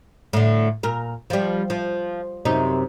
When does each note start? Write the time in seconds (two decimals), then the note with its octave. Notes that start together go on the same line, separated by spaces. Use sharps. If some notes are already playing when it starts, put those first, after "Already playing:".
0.33 A2 D3
0.83 A#2 A#4
1.30 F3 G3
1.70 F3
2.45 F#2 C3 D#4